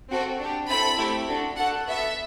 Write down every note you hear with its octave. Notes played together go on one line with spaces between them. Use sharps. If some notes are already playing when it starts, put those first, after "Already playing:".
C4 F#4 A4
D4 G4
C4 E4 A4 B5
A3 C4 E4 G4
D4 F#4 A4
D4 F#4 A4 F#5
B3 F#4 A4 E5